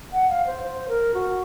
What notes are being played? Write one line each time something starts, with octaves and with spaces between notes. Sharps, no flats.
F#5
F5
C5
C5
A#4
F#4